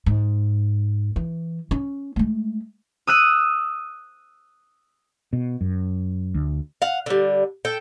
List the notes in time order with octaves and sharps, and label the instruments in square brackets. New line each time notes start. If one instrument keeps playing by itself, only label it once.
[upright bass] G#2
E3
C#4
G#3 A3
[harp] D#6 E6 F#6 D#7
[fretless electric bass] B2
F#2
D2
[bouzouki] F5 F#5
D3 G3
A4 G5